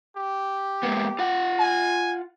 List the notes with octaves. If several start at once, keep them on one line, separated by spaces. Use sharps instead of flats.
G4
G#3 A#3 B3
F4 F#5
G#5